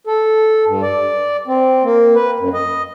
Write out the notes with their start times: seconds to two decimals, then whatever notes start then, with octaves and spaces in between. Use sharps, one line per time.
0.07 A4
0.66 G2
0.82 D5
1.47 C4
1.83 A#3
2.15 B4
2.39 F#2
2.54 D#5